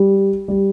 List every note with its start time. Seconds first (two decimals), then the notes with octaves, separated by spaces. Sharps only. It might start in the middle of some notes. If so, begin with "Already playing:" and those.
Already playing: G3
0.48 G3